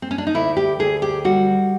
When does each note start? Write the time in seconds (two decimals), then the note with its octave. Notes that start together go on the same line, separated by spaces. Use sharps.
0.02 C4
0.11 C#4
0.18 D4
0.27 D#4
0.35 D2 E4
0.57 G4
0.80 D2 G#4
1.02 G4
1.25 G3 F#4